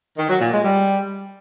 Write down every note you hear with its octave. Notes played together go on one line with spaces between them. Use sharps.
D#3
F#3
A#2
G#3
G3